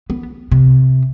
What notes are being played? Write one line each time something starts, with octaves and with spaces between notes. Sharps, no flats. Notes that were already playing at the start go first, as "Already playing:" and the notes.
B3
C3